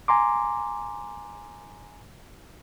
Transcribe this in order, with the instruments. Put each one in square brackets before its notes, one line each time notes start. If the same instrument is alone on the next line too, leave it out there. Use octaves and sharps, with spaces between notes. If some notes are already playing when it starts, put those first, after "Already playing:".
[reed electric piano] G#5 A#5 C6 D6